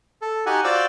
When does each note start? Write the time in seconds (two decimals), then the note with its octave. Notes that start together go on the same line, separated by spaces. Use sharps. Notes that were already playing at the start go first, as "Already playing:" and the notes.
0.22 A4
0.46 D#4 F#4 G4 F#5 G#5
0.64 F4 F#4 C5 D5 D6 E6